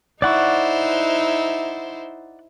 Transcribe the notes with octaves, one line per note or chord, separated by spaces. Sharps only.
D#4 E4 C5 D5 F#5 C#6